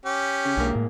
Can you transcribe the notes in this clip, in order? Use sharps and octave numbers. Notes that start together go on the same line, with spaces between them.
C#4 G4
C#3
B1 G#2 A#3 D4
A2